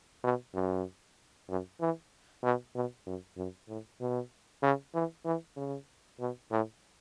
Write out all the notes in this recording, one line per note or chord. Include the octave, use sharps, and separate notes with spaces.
B2
F#2
F#2
E3
B2
B2
F#2
F#2
A2
B2
C#3
E3
E3
C#3
B2
A2